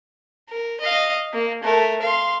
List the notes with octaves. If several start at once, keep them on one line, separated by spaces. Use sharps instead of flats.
A#4
D#5 F5
A#3
A3 A#4
F5 C6